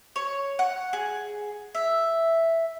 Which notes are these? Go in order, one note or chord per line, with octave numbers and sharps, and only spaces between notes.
C#5
F#5
G#4
E5